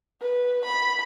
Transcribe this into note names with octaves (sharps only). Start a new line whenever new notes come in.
B4
B5